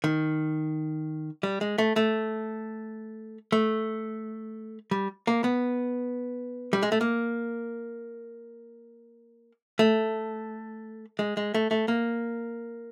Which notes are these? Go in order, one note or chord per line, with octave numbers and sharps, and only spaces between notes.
D#3
G3
G#3
A3
A3
A3
G3
A#3
B3
G3
G#3
A3
A#3
A3
G#3
G#3
A3
A3
A#3